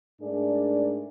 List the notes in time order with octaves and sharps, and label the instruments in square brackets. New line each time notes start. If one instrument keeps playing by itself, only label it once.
[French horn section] G#2 A3 D4 G#4 A#4 D5